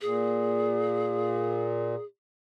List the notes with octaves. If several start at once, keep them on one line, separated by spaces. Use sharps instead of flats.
A#2 G#4